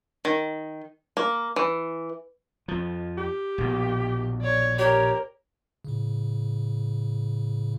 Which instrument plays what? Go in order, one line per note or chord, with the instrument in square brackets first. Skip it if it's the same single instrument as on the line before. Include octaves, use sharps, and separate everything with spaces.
[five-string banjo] D#3
A#3
E3
[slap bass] F2 F3
[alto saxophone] G4
[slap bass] A#1 B2
[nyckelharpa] C#5 D5
[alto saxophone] G4 [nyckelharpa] A#4 [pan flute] C#5
[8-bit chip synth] A2 C#3